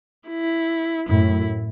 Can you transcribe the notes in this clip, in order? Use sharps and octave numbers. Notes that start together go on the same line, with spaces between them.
E4
F#2 A2 E4